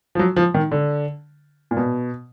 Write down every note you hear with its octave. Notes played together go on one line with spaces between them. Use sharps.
F3
F#3
F3
D#3
D3
A#2
B2